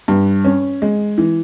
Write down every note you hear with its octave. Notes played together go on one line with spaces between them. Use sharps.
G2
C#4
G#3
E3